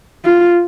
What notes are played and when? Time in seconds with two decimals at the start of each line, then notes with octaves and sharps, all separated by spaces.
0.25 F4